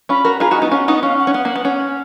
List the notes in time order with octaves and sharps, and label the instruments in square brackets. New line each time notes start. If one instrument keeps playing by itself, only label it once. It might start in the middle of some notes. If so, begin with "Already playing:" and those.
[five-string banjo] C#4 F4 [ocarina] B5
[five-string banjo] F#4 A#4
[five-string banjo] F4 G#4 [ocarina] A#5
[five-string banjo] D#4 F#4
[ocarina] D#5
[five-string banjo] B3 D#4
[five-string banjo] C#4 F4 [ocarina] F#5
[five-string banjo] B3 D#4
[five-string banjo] C#4 [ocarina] F5
[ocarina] F#5
[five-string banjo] C#4
B3
A#3
B3
C#4